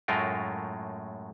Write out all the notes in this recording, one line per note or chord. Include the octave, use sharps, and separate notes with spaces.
F#2 A2 G#3 A3 F4 A#4